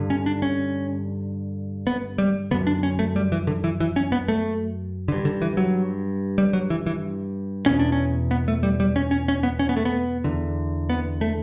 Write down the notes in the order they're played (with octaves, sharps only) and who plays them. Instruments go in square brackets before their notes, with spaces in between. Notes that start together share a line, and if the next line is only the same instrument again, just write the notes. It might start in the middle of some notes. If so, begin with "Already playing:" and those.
Already playing: [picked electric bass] G2 D3
C#4
D4
C#4
B3
G3
D3 B3
F#2
D4
C#4
A3
G3
E3
D3
E3
E3
C#4
B3
A3
G2 D3
D3
E3
F#3
G3
F#3
E3
E3
E2 B2 C#4
D4
C#4
B3
A3
G3
G3
C#4
C#4
C#4
B3
C#4
B3
A3
B3
E2 D3
B3
A3